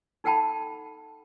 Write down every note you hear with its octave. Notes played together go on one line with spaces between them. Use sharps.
D#4 A4 F#5 G5 A5 B5